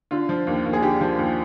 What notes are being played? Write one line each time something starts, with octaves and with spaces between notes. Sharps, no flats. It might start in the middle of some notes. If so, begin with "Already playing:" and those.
D3 F4
F3
D#2
D#2
G#4
D3 G4
F3
D#2